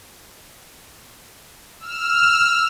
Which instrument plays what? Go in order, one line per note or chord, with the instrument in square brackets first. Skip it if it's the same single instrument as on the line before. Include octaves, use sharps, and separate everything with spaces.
[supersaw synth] E6 F6